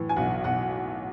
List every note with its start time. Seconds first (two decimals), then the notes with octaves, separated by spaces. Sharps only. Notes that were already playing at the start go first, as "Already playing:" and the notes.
Already playing: A2 E3
0.09 G#5
0.16 B1 F#5
0.44 B1 F#5